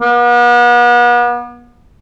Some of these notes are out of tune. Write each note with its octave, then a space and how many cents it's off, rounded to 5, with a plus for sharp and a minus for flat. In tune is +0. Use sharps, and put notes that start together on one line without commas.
B3 -40